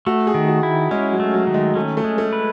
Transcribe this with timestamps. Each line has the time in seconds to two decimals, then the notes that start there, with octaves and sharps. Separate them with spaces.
0.06 A3 F#4
0.27 G#4
0.34 D#3
0.48 F#4
0.63 E4
0.91 G#3 C#4
1.12 F#3
1.20 A3
1.34 F#3
1.47 D#3
1.54 G#3
1.75 A3 C#4
1.97 A3
2.04 G#3
2.18 A3
2.33 B4